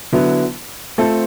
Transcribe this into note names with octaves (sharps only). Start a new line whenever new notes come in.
D3 F#3 B3 E4
A3 C4 F4 A4 C5